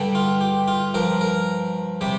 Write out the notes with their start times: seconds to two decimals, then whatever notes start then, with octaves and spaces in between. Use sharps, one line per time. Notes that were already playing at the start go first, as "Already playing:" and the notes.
Already playing: G2 D3 G3
0.15 F4
0.41 G4
0.68 F4
0.94 G2 F3 A#4
1.21 A#4
2.01 C3 G3 G4